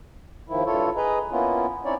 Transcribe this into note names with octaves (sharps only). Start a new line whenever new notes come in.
D#2 D#3 F3 E4
G2 E4 F4 A4 C#5
G#4 B4 D#5 A#5
A#3 B3 C#4 E4 F4
C4 C#4 D#4 E4 C#5 D5